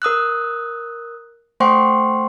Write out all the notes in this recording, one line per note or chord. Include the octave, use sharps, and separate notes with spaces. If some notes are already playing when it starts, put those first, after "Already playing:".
A#4 D#6 E6 F#6
A3 C5 F#5 G5 C6 C#6